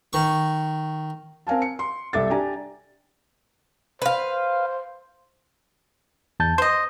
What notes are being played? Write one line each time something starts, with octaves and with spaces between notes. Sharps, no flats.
D#3 C#6
C4 A#4 F5 G#5 A5
C#7
C6
C2 A4 E5 D6 A6
D4 G4 D5 G#5 A#5
B4 C5 F5
E2 A5 G6
C5 D#5 C6